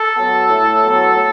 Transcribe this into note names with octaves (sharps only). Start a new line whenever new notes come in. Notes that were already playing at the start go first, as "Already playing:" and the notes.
Already playing: A4
F#3 B3
A2
F#3 B3
A2